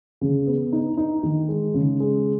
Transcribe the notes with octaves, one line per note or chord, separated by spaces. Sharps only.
C#3
B3
D#4
D#4
D#3
G#3
C#3
G#3